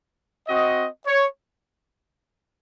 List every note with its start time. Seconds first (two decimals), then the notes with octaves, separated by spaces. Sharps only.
0.48 C4 F#4 D#5
1.06 C#5